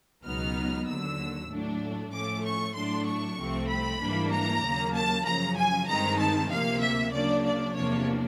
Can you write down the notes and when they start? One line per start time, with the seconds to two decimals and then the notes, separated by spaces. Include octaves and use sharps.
0.25 C#2 B2 F#3 B3 D#4 F6
0.88 D#2 D3 F#3 E6
1.50 A2 F#3 A3 D4
2.12 A2 F3 A3 C#4 D6
2.44 C#6
2.75 A2 F#3 A3 D4 C6
3.07 C#6
3.38 C2 C3 F3 A3 C4
3.69 B5
4.00 G#2 E3 G3 A#3 D4
4.31 A#5
4.63 D#2 C#3 F#3 A#3
4.94 A5
5.25 F#2 C#3 F3 A#5
5.57 G#5
5.88 G2 D#3 G#3 C4 D#4 A#5
6.19 A5
6.50 D2 C3 F3 A#3 F5
6.81 E5
7.13 C#3 F#3 A#3 D4 D5
7.45 D5
7.75 E2 C3 F3 A#3 D4 C#5